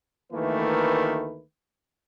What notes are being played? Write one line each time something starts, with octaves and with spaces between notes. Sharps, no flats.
D2 D#3 E3 A3 A#3 B4